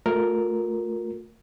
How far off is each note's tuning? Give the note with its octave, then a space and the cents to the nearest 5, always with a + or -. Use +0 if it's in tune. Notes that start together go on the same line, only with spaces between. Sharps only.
A3 +0 F4 +35 A#4 +0